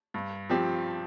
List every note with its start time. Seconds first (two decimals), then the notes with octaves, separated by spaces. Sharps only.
0.14 G2
0.49 F3 C4 G4